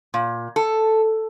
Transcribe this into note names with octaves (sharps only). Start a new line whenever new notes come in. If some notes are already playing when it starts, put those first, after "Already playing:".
A#2
A4